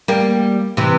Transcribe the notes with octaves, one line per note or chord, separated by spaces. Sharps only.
G3 A#3
C3 E3